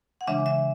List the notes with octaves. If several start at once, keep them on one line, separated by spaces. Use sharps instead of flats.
F#5
C#3 E3 G#3 D4 E5
E5